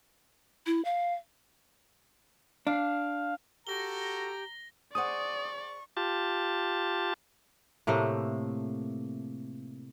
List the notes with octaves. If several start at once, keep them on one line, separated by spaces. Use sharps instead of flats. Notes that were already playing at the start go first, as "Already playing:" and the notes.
E4
F5
D4 F5
F#4 G4 A4 A#5 A#6 G7
G#4 C5 D5 F#5 C#6 D#6
F4 G4 A5
A2 C3 A3 A#3